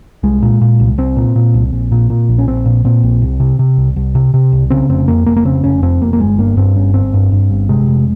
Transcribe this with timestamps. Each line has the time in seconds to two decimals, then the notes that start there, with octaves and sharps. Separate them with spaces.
0.23 C2 G#3
0.42 A#2
0.61 A#2
0.80 C2
0.98 C2 C4
1.17 A#2
1.36 A#2
1.54 C2
1.73 A#1
1.92 A#2
2.10 A#2
2.29 A#1
2.38 C#4
2.47 A#1 C4
2.66 A#2
2.85 A#2 C4
3.03 A#1
3.22 C2
3.40 C3
3.59 C3
3.77 C2
3.96 C2
4.15 C3
4.34 C3
4.52 C2
4.70 C#3 C4
4.89 F1 C4
5.08 F2 A#3
5.26 F1 A#3
5.37 A#3
5.45 C#3 C4
5.64 F1 C#4
5.82 F2 C4
6.01 F1 A#3
6.13 A#3
6.20 G1 G#3
6.39 G2 A#3
6.57 G2 C4
6.76 G1 C#4
6.94 G1 C4
7.14 G2
7.32 G2
7.50 G1
7.69 C3 G#3
7.88 F1